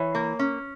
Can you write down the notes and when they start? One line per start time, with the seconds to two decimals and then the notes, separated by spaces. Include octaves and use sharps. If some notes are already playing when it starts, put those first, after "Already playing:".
Already playing: E3 C#5
0.15 A#3
0.39 C#4